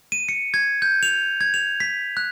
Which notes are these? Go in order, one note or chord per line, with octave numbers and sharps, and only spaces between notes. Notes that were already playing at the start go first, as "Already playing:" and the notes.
D#7
C#7
G#6
G6
F7
G#6
F7
B6
F#6